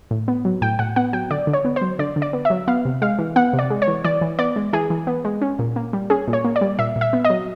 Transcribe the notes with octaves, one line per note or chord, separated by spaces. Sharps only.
A2
B3
F#3
A2 G5
A2 F#5
B3 F#5
F#3 G5
D3 D5
D3
C#5
B3
C5
F#3
D3 D5
D3
D5
B3
E5
F#3
B3 F5
C3
G#3 F5
E3
B3 F#5
C3
D5
G#3
C#5
E3
E3 D5
E3
B3 D5
G#3
E3 G#4
E3
B3
G#3
C#4
A#2
A#3
G3
C#4 G#4
A#2
C#5
A#3
D5
G3
A#2 E5
A#2
E5
B3
D#5
F#3